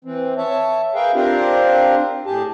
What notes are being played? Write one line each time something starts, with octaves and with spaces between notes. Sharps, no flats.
E3 C4
C#5 E5 A5
G#4 A#4 B4 E5 F5 G5
C4 D4 F4 G4 A#4 C5
A2 G4 G#4 A5